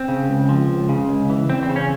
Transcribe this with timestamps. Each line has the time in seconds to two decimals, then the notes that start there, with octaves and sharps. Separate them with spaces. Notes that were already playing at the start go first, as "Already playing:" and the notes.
Already playing: C4
0.08 C#3
0.29 C#2
0.49 F3
0.69 C#2
0.89 C#3
1.09 C#2
1.30 E3
1.49 E2 C4
1.63 C4
1.69 C#3
1.76 C#4